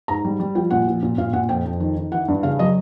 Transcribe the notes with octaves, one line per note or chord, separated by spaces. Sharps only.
G#2 A#5
G3
G3
F3 G5
A#2 F#5
F3
A#2
A#2 F5
A#2 F#5
F2 G5
F2
D#3
D#3
E3 F#5
G2
C#3 F5
F#3 D#5